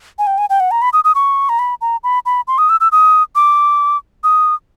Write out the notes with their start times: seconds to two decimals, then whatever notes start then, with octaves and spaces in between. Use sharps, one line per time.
0.19 G#5
0.27 G5
0.38 G#5
0.50 G5
0.60 F#5
0.71 A#5
0.82 B5
0.93 D#6
1.04 D#6
1.15 C#6
1.49 A#5
1.59 B5
1.81 A#5
2.04 B5
2.26 B5
2.48 C6
2.58 D#6
2.69 E6
2.80 E6
2.92 D#6
3.35 D6
4.24 D#6